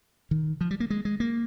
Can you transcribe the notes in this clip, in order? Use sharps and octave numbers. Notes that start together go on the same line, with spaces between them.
D#3
F3
G3
A#3
G#3
G#3
A#3